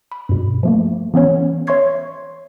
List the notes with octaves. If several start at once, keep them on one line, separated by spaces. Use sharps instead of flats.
B5
G2 B2
F3 A3 A#3
E3 B3 C#4 C#5
C#5 E5 C6 C#6 G#6 C7